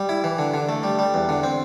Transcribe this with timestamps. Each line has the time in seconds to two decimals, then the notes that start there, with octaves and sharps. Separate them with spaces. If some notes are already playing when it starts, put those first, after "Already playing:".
Already playing: G3
0.09 E4
0.24 E3
0.39 D3
0.54 D3
0.69 A3
0.83 G3
0.99 G3
1.14 E2
1.29 D3
1.43 C4